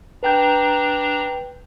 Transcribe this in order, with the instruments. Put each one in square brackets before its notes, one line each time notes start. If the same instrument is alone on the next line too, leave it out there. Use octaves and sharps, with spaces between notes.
[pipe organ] D4 A#5 [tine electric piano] B4 G5 G6